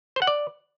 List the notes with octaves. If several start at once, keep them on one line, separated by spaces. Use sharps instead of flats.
C5
F#5
D5